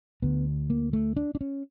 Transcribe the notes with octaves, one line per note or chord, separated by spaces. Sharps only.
D2 D3 B3
A#3
A3
D4
D4
C#4